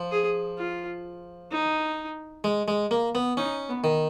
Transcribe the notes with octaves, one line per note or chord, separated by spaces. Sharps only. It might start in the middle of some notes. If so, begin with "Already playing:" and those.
Already playing: F3
G#4
F4
D#4
G#3
G#3
A#3
B3
C#4 D#4
B3
D#3